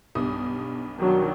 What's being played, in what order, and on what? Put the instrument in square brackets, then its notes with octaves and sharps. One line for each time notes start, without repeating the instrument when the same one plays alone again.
[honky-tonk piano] B1 G2 D#6
[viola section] D#3 F#3 D4